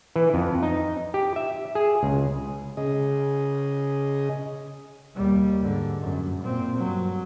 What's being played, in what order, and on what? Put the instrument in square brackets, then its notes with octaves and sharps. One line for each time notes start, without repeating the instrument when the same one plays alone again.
[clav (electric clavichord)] E3
F2
D#4
G4
E5
G#4
C#2
[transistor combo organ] C#3 G#4 D#5
[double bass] D#2 G3
G#2 D3
F#2
A#2 C4
G2 F#3